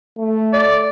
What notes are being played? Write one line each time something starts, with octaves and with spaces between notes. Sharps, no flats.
A3
D5